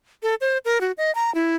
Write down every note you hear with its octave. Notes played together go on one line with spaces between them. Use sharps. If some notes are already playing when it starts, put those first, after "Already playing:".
A4
C5
A#4
F#4
D#5
A#5
E4